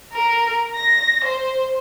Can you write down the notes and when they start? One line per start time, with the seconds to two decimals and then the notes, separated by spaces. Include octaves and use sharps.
0.13 A#4
0.75 A#6
1.25 C5